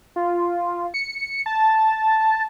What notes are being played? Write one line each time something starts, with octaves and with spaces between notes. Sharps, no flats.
F4
C#7
A5